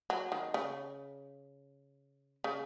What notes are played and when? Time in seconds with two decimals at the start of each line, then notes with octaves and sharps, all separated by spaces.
0.10 F#3
0.32 D#3
0.54 C#3
2.44 C#3